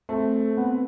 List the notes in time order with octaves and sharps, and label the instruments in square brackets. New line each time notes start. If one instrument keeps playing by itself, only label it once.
[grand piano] A3 C4
B3
C4